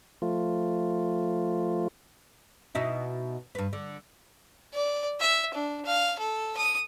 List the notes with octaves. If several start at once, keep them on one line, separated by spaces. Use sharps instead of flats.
F3 A3 F4
B2 D#4 E4
G2 B4
D3
D5
E5
D4
F5
A4
D#6